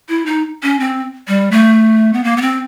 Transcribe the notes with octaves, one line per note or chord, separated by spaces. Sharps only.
E4
D#4
C#4
C4
G3
A3
B3
A#3
B3
C4